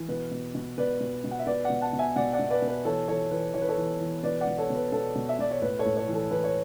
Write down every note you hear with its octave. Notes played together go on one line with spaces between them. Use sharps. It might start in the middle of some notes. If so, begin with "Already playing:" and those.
Already playing: E3
B2 B4
B2
B2
B2 B4 D5
B2
B2
F#5
E5
B2 B4 D5
D5 F#5
B2
F#5 A5
B2
E5 G#5
B2 D5 F#5
D5 F#5
B2
B4 D5
B2
B4
E3 A4 C#5
E3 A4 C#5
E3 B4
E3 C#5
B4
A4 C#5
E3
E3
B2 B4 D5
D5 F#5
B2
A4 C#5
B2
B4
B2 A4
B2
E5
B2 D5
C#5
A2 B4
A4 C#5
A2
A4 C#5
E3
A4
E3 B4
C#5